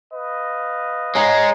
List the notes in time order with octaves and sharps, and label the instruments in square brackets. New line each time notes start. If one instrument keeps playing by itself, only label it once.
[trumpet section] B4 D#5 F5
[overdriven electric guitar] G#3 D#4 [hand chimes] C#5 A#5 C7